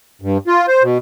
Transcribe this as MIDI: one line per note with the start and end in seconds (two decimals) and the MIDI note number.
0.22 0.38 43
0.47 0.66 65
0.68 0.83 72
0.83 0.98 47